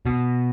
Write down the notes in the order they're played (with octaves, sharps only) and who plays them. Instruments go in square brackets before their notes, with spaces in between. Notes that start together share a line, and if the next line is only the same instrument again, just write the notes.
[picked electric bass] B2